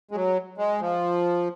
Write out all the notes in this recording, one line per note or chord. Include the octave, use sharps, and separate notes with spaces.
G#3
F#3
G#3
F3